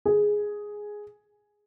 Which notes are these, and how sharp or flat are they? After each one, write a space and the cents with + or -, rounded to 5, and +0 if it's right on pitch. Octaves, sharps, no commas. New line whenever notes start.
G#4 +0